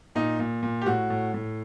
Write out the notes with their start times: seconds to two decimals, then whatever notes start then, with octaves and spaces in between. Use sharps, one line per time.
0.15 A#2 D#4
0.39 A#2
0.63 A#2
0.81 G4
0.86 A2 F#4
1.10 A2
1.34 A2